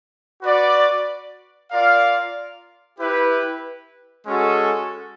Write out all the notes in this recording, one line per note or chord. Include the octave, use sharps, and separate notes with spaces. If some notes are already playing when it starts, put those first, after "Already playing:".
F#4 B4 D5
F4 A#4 D5 F5
E4 G4 B4
G#3 C#4 F#4 A4